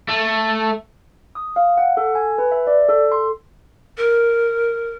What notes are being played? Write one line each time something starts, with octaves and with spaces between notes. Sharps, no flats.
A3
D#6
F5
F#5
A4
G#5
B4
E5
D5
A4
C6
A#4